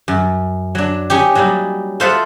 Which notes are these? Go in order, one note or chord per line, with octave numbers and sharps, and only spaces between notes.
F#2
F#3 D4
C#4 D#4 G4
F#3 G3 A#3 D#4
F4 A4 C5 D#5 E5 F#5